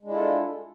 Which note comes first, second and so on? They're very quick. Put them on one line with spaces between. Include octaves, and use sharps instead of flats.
G#3 D4 E4 F4 A4